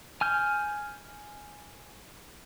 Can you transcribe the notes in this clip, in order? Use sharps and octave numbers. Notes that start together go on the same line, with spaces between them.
G#5 F6 G6